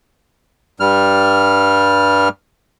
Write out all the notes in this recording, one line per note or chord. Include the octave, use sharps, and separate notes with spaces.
G2 G3 F6